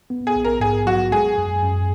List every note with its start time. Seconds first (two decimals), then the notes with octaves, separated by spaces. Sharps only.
0.10 B3
0.27 G#4
0.36 A#1
0.45 A#4
0.60 G#2 G#4
0.86 F#3 F#4
1.12 G#3 G#4
1.38 F#2
1.62 F#2